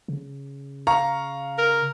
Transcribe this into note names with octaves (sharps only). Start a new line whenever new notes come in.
C#3
F5 A#5 C#6
A#4